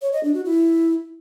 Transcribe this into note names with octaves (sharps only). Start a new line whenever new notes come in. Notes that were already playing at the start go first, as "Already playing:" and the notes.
C#5
D#5
D4
F#4
E4